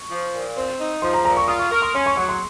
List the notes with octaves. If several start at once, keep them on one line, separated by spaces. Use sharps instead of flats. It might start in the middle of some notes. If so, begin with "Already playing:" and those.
Already playing: C#6
F3
A#2
C4
D#4
F3 C6
A#5
A#2 A#5
C#6
F4 D#6
C#6
A#4 C#6
C6
C#4 C6
C#6
F#3 C#6
C6